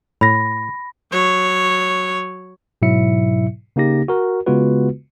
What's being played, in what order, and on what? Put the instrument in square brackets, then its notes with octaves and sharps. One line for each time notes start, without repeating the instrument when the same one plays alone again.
[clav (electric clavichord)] A2 [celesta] B5 A#6
[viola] F#3 C#5
[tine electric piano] G#2 B2 F#3 E4 E5 C#7
C#3 A#3 D#4 G4 A#6
F#4 A#4
C#3 G#3 B3 F4 F#4 B4